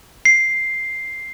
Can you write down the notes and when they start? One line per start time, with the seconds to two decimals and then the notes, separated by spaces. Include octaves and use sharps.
0.25 C7